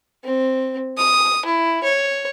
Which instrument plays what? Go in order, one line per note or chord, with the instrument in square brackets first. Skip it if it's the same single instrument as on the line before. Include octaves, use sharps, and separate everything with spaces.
[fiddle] C4
D#6
E4
C#5